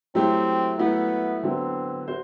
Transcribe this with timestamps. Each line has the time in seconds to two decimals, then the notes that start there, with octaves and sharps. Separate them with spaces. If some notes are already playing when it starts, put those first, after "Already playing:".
0.15 F#3 A3 C4 E4 G4
0.79 F#3 A3 B3 E4
1.43 D3 F#3 B3 C4
2.08 F#4 C5